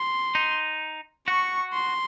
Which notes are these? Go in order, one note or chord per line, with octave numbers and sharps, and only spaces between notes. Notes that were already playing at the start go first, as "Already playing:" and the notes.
Already playing: C6
D#4
F#4 C#6
C6